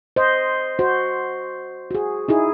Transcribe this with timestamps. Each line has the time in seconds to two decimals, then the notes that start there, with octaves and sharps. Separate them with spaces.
0.16 C5 D#5
0.79 F#4 C5
1.91 F#4 G#4
2.28 D#4 E4 G#4